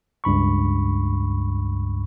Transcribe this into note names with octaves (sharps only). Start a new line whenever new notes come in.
C#2 G2 B5 C#6